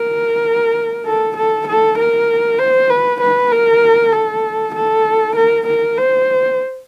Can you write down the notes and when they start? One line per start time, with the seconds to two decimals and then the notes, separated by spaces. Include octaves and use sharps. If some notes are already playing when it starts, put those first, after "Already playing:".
Already playing: A#4
1.06 A4
1.37 A4
1.67 A4
1.98 A#4
2.59 C5
2.90 B4
3.21 B4
3.52 A#4
4.13 A4
4.75 A4
5.36 A#4
5.67 A#4
5.98 C5